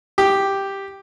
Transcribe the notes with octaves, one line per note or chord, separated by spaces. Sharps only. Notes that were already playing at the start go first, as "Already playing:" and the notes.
G4